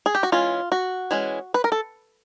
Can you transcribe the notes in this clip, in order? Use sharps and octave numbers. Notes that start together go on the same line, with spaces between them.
G#4
G4
F#4
E3 G#3 C#4 F4
F#4
E3 G#3 C#4
B4
A#4
A4